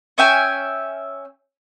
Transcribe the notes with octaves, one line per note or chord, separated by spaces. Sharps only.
C#4 E5 G5 G#5